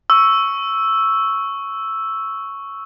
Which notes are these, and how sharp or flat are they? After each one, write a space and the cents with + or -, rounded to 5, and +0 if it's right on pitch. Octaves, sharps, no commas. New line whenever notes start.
C#6 +0 E6 +0